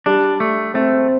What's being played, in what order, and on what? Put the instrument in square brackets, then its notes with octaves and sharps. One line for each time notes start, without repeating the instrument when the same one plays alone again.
[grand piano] G3 [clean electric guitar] D4
[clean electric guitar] A3
[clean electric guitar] A3 [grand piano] C4